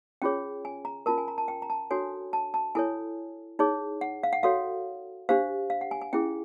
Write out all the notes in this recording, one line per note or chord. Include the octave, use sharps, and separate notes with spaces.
C#4 F4 G#4 C#5 G5
G#5
A#5
C#4 F4 A#4 A5
G#5
A#5
A5
G5
A#5
A5
D4 F#4 A4 C#5 G#5
A5
A5
E4 A4 C#5 G#5
D#4 G#4 C#5
F#5
F5
F#5
F#4 A4 C#5 F5
D4 G4 C5 F5
F5
F#5
G#5
G#5
C#4 E4 G#4 G5